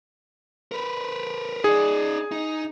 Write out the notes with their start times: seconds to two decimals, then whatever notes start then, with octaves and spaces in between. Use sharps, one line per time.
0.72 A#4 B4
1.64 D#4 G#4 D5
2.32 D#4